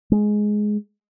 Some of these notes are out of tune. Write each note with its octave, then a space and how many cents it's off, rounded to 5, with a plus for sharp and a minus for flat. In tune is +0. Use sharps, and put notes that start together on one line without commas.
G#3 +10